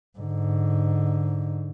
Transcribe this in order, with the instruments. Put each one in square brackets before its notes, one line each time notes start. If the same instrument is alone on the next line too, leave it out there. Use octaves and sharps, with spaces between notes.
[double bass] G#2 D3